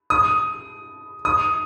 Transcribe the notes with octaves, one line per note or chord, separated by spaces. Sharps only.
D#6
D#6